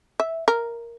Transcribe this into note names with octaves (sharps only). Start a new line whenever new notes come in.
E5
A#4